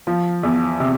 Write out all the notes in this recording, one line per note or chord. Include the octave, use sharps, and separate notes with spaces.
F3
E2
C3